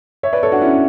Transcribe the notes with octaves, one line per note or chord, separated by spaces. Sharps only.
C#5 E5
B4 D5
A4 C#5
D4 F#4
C#4 E4